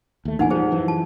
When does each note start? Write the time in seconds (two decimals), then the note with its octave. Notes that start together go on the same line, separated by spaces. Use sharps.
0.25 D#2 A3
0.39 E2 A#2 E3 D#4 F#5 G#5
0.50 F3 G3 G#4 C5
0.71 F#2 E3 F3
0.88 A5